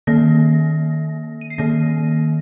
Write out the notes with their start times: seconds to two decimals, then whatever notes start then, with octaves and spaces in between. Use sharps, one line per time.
0.07 D#3 A#3 A#6
1.41 D#7
1.50 C7
1.58 D#3 A#3 A#6